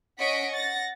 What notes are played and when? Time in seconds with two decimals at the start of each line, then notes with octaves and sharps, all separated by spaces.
0.19 C#4 D#5 F#5 C#6 B6 D7
0.53 F#5 A6 A#6